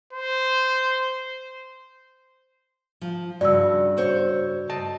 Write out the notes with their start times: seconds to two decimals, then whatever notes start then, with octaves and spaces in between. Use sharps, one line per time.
0.13 C5
3.02 F3
3.41 G2 C#3 F#4 D5 E6
3.97 F#4 C5 C#5
4.70 D#5 A5